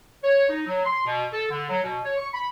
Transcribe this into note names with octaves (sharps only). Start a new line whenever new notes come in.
C#5
D#4
F#3
C6
B2
A4
D3
F#3
B2
C#5
C#6
B5